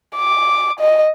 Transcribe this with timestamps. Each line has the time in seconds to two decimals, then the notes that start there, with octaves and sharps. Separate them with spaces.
0.16 D6
0.80 D#5